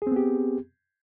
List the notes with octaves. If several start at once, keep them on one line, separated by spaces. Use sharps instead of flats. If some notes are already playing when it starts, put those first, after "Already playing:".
B3 C4 G4 G#4